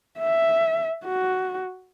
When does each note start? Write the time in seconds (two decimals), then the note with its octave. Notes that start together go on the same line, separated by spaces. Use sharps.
0.18 E5
1.05 F#4